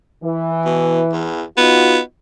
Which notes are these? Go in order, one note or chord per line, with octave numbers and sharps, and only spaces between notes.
E3
B2
E2
B3 D#4 F4 F#4